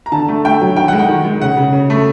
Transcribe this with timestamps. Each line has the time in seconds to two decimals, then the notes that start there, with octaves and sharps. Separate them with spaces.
0.06 A#5
0.12 D3 A5
0.28 A3
0.45 A3 G5
0.61 F#3
0.76 D#3 G5
0.88 G#3 F#5
0.99 G5
1.08 D#3
1.25 G#3
1.41 C#3 F#5
1.57 C#3
1.73 C#3
1.90 A3